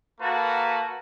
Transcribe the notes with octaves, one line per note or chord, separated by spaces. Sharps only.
A#3 F#4 A4 B4 A5 A#5